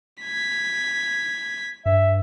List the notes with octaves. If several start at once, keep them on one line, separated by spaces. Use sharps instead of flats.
G#6 B6
G2 E5